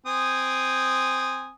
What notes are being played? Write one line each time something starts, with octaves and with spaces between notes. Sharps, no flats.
C4 G#5 D#6